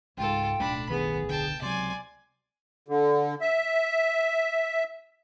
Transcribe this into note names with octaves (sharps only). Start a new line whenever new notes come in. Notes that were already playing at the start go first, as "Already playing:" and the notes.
C#2 G#2 F4 A4 G5
D1 B1 A3 D4 B5
G2 D#3 B3 G#4
D3 G5 A5
C#2 C3 F#3 D5 G#5 C6
D3
E5